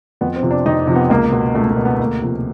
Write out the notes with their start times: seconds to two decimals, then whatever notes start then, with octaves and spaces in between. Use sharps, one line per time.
0.21 F2 B3
0.36 C4
0.43 C3 F3
0.51 D4
0.66 F2 D#4
0.87 C3 F3
0.95 B3
1.10 C#2 A#3
1.32 B2
1.54 C#2 A3
1.70 A#3
1.77 B2
1.85 B3
1.99 D2 A#3
2.22 C3 F3